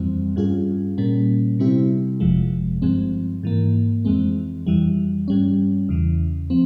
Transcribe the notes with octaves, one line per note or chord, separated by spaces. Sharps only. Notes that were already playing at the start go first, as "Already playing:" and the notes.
Already playing: F2 E3 G3 C4
G2 G3 C#4 F4 G#4
A#2 G3 A#3 C#4
C3 G3 C4 E4 G4
G1 F2 C3 F3 G#3
G2 F3 G#3 C4
G#2 E3 A#3
F2 E3 G#3 C4
F2 E3 G3
G2 G3 C#4
E2 C#3 E3
F3 C4